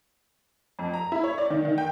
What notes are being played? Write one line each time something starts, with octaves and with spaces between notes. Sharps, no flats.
F2
A#5
E4
C#5
D5
D#3
D#3
G5